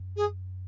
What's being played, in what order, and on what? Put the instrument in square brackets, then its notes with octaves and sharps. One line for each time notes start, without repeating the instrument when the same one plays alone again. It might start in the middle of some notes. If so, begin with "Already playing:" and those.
Already playing: [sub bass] F#2
[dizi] G#4